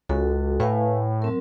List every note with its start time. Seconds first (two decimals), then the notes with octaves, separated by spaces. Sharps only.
0.09 C#2 F#4 A4
0.60 A2 B4 F5 G#5
1.22 F#3 C4 A#4